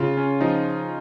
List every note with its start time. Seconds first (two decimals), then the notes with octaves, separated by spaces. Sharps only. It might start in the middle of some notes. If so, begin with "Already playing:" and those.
Already playing: C#3 F4
0.17 C#4
0.41 F3 D#4